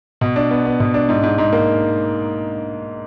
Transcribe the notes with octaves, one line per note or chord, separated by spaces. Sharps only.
B2
D4
B3
B3
B2
D4
G#2
G#2
G#2
A#3